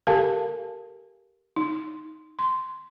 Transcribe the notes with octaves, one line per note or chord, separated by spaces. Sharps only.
G4 A4 A#4 F5 G#5 A5
D#4
C6